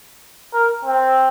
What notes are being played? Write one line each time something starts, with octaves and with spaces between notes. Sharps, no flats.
A#4
C4